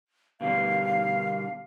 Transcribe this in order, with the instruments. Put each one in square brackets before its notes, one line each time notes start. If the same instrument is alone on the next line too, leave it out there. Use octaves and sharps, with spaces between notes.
[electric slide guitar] B2 D3 G3 [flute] F5